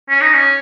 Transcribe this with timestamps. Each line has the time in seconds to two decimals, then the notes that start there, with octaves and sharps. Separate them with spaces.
0.09 C#4
0.21 D#4
0.34 C#4